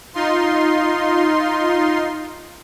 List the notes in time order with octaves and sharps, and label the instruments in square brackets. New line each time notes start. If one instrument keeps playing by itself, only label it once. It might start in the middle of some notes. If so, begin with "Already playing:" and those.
[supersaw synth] D#4 F4 C6